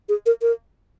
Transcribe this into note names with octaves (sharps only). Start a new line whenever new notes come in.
G#4
A#4
A#4